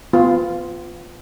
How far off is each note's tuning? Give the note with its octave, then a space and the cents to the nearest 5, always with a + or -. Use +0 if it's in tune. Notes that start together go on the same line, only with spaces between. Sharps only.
B3 +40 F4 +0